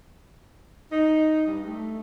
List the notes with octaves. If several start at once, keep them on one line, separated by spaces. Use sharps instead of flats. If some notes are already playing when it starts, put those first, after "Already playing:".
D#4
G2
A3